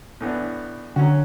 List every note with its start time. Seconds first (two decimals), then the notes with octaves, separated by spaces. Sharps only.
0.21 A2 E3 B3 D4
0.96 D3 F#3 C#4 F#4